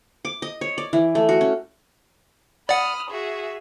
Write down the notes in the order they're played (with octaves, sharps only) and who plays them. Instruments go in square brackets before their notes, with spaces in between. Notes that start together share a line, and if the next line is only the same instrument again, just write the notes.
[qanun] D6
D#5
C#5
D5
E3
A3
F#4
C#4
[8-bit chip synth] D5 F#5 [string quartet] B5 D#6 F6
[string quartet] F#4 G#4 E5